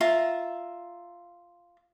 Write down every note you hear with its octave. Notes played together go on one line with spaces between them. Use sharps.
F4 E5 A#5